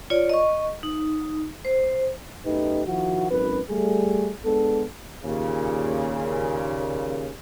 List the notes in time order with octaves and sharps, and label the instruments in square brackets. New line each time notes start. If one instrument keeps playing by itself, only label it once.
[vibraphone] F4 C#5 D5
D#5 C#6
D#4
C5
[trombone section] B1 F#2 A3 D#4 G4 B4
D#3 F3 E4 F#4
G#1 F#2 B4
G3 A3 G#4
G#3 B3 D4 A4
[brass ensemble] D#2 A#2 C#3